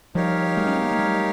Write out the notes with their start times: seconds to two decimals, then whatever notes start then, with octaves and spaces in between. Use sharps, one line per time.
0.15 F3 G3 D#4 G4 A#4 C#5 F5
0.57 F#3 G#3
0.66 C#4
0.76 C4
0.83 B3
0.91 A#3
0.99 G3 A3